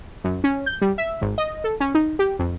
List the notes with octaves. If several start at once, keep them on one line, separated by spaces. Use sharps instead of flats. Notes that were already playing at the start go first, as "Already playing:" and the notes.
F#2
C#4
G6
G3
E5
G#1
D#5
A4
C#4
D#4
G4
F2